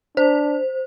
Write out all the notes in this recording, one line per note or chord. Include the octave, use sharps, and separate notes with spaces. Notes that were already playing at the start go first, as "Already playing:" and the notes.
D4 C5